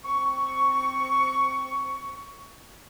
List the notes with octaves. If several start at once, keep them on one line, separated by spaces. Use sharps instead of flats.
C4 C#6